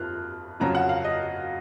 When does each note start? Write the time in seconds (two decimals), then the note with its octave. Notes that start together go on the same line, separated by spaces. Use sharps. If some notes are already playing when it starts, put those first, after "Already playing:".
Already playing: F2 F3 F6 F#6
0.60 F2 C#3 F#3 C#4 A#5
0.75 F#5
0.89 F5
1.04 D#5